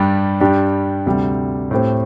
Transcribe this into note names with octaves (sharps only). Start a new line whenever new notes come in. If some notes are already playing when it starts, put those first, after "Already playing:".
Already playing: G2 G3 D4 G4
G2 G3 D4 G4
D2 C3 G3
A2 A3 C4 G4